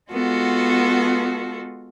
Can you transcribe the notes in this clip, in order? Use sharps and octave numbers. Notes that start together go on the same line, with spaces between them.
G#3 B3 F4 F#4 A4